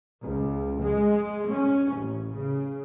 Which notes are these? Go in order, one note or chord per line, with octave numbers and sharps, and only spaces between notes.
C#2
G#3
C#4
A1
C#3